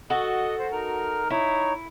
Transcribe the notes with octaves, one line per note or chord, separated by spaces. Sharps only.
F#4 A4 D#5
C5
D#4 A#4 F6
D#4 E4 C#5